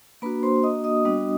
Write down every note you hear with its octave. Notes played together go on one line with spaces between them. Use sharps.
A#3 D4 F#4 B4 B5
C5 C6
D#5 D#6
D#5 D#6
G3 B3 D4 F#4